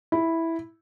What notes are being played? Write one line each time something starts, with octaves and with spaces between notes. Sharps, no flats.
E4